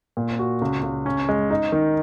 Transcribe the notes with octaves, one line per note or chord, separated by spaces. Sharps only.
A#2
F#4
C#2
C#2
C#4
G#3
D#4
D#3